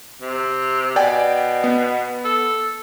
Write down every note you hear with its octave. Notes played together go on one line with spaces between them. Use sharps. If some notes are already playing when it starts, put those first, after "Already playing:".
C3
B2 D5 G5 G#5
B3
A4